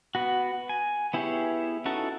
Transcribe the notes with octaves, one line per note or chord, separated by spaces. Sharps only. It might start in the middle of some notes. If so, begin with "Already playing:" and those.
B3 F#4
G#5
B3 E4 G4 G#4 C#5
C#4 D#4 E4 F#4 A4